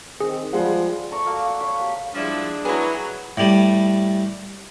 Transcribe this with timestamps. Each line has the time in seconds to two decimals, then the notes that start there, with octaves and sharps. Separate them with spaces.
0.20 D#3 C4 G#4
0.53 F3 G3 G#3 F#5
1.11 A3 D5 A#5 C#6
1.25 A3 A#3 F#4
1.46 F#5
1.61 C#5 F5 B5
1.78 A#3 G4
2.15 F3 G3 G#3 D4 E4 D5
2.65 F#3 E4 G#4 B4
3.37 A2 G3